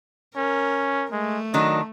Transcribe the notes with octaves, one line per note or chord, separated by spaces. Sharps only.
C#4 A#4
G#3 A3
D#3 F#3 D4 D#5